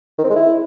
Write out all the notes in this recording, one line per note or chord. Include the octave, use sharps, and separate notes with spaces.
D#3
C4
G#3
E4